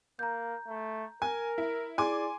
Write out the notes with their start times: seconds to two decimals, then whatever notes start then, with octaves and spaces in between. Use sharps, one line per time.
0.19 A#3 A#5 G6
0.67 A3
1.22 A#4 G#5
1.58 E4
1.98 E4 G#4 D5 G#5 C6 D6